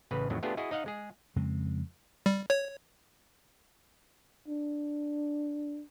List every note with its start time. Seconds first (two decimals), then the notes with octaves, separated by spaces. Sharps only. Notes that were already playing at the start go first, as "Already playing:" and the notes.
0.11 A1 C#3 B4
0.30 F2 A2 D#3 F#3
0.43 A3 B3 D4 F4 G4 G#4
0.57 E4 F#4 G#4 D#5
0.71 D#4 D#5 F5 F#5
0.86 G#3 G#4
1.36 F2 C#3 G#3 C4
2.26 G3
2.50 C#5
4.48 D4